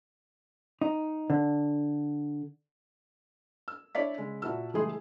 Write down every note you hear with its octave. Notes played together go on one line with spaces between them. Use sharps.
D#4
D3
E6
D4 E4 C#5 D5 B6
C#3 G#3
A#2 E4 F#4 A5 E6
C#2 E3 G3 A3 G#4 C6